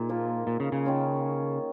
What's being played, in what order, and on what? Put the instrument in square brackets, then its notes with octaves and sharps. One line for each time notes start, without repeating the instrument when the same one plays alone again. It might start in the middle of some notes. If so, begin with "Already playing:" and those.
Already playing: [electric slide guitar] A#2 [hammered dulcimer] D#4 G#4
[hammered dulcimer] F3 A#3 F4
[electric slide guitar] A#2
C#3
C#3
[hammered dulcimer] D#3 C#4 F4